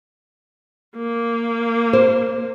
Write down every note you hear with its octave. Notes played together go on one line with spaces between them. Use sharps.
A#3
C5